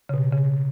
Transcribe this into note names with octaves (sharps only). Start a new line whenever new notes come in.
C#3
B2
C#3